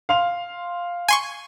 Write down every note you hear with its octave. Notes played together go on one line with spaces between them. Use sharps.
F5 C6 F7
G#5 C6 C#6